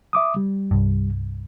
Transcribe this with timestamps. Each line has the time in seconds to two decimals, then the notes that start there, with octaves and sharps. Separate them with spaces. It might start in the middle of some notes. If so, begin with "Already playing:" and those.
0.13 E5 D6 D#6
0.36 G3
0.71 C2 G2